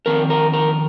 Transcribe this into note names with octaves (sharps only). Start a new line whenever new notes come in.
F2 D#3 C4 A#4
A#4
A#4